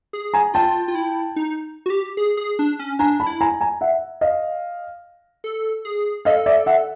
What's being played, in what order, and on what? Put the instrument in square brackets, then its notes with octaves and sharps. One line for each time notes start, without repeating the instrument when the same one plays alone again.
[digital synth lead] G#4
[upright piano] G#5 A#5
[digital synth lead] F4 [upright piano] G5 A5
[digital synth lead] F4
E4
D#4
F#4
G4
G#4
G#4
D4
C#4
[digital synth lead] D4 [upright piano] G#5 A#5
[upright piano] A5 B5
[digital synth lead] E4
[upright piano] G#5 A#5
G#5 A#5
E5 F#5
D#5 F5
[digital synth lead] A4
G#4
[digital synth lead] A4 [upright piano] D#5 F5
[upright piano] D5 E5
E5 F#5